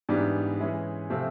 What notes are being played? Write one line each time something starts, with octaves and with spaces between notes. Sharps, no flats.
G#2 E3 G3 B3 D4
E3 G#3 C#4 E4 G#4
C3 F3 A3 C4